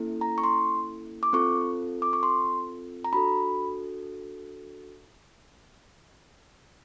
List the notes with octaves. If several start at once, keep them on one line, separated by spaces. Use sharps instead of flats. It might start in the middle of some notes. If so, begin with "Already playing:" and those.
Already playing: A#3 C#4 E4 A4
A#5
C#6
C6
D6
C4 F4 A4 C#6
D6
C#6
C6
A#5
D4 F#4 A4 B5